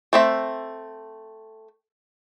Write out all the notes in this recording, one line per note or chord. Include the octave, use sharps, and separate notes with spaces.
A3 C4 E5